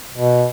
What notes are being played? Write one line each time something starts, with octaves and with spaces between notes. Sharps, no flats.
B2